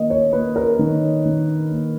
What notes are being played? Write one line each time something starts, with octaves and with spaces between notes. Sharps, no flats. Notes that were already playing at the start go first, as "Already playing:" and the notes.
Already playing: D#3 A#3 D#5
C#5
A#3 B4
A#4
D#3
D#3
A#3